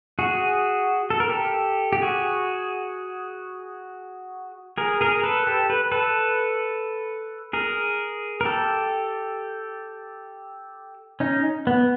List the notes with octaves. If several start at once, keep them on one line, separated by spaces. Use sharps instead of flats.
F#4 G#4
A4
A#4
G4 A4
G4
F#4 G#4
G#4 A#4
G#4 A#4
A4 B4
G4 A4
B4
A4 B4
G#4 A#4
A#4
G4 A4
C#4 D#4
B3